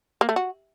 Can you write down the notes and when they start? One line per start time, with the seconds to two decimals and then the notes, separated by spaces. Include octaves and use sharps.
0.21 A#3
0.29 A3
0.36 F#4